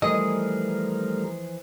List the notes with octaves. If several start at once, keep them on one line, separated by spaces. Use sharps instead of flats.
E3 F3 G3 A3 G#4 A#4 D#5